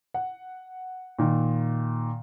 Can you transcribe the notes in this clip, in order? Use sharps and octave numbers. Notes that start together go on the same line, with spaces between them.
F#5
A#2 D#3